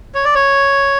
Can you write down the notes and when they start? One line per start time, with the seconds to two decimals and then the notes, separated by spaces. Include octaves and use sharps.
0.15 C#5
0.24 D5
0.35 C#5